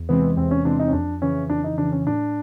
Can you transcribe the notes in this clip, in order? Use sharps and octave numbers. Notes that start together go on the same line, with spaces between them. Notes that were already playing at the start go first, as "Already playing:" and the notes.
Already playing: E2
C3 E3 G#3 B3 C4
E2 C4
C#4
C3 E3 G#3 C4 D4
D#4
C#4
F2 D4
C#3 E3 C#4
F2 D4
D#4
C#3 E3 D4
C#4
A2 D4